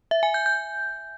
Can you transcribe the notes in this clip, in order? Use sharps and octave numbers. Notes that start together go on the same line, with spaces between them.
E5
G#5
G6
G6